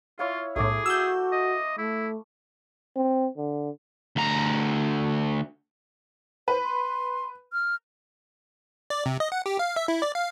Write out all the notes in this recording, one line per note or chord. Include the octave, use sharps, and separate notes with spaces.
E4 F4 C#5 F5
B1 A2 A3 G#4 D6
F#4 E6 G6
D#5
A3 E4
C4
D3
D2 A#5
B4 C5
C6
F6
D5
C3
D#5
F#5
G4
F5
E5
E4
D5
F5